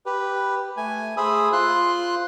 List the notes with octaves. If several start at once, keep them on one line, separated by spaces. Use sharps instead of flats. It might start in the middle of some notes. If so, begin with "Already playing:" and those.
G4 B4
A3 G#5
A3 G#4 C5 B5 D#6 E6
F4 C5 C6 F#6